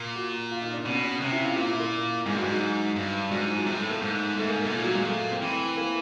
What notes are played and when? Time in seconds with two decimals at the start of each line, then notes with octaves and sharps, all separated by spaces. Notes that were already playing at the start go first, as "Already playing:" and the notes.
Already playing: A#2
0.16 F#4
0.51 F4
0.62 D#4
0.73 D4
0.86 B2 C#4
1.03 C#4
1.21 C3 C#4
1.32 E4
1.44 F4
1.56 A#2 F4
1.68 E4
1.80 A#3
2.26 G#2 G#3
2.35 G2 F#3
2.44 G#2
2.50 F#3
2.96 G2
3.31 G#2 F#3
3.44 F3
3.55 F#3
3.66 A2 G#3
3.78 A3
3.90 A#3
4.02 G#2
4.37 G#2 A3
4.49 A#3
4.61 A#3
4.65 B2
4.72 A#2 F3
4.84 F#3
4.95 G#3
5.07 A3
5.31 C4
5.42 E3
5.77 A#3